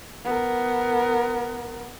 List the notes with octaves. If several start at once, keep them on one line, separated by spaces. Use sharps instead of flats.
B3 A#4